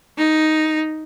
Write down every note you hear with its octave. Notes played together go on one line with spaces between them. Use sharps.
D#4